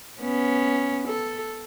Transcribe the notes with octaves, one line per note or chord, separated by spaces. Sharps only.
B3 C#4
A4